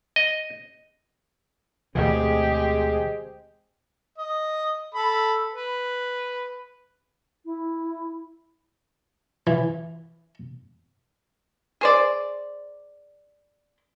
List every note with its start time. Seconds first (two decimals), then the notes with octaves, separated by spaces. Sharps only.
0.16 D#5
1.95 D2 B2 E3 G#3 C4 G4 G#4
4.18 D#5
4.95 A4 B5
5.54 B4
7.45 E4
9.47 E3
11.81 G#4 C5 D5